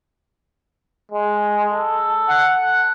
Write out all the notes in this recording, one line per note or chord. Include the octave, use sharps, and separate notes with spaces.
G#3
A4
F#5